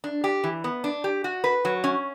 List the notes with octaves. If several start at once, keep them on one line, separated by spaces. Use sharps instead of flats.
D4
G4
E3
B3
D4
G4
F#4
B4
F#3
C#4